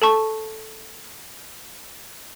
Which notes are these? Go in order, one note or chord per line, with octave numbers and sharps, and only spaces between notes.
A4 A5 C#6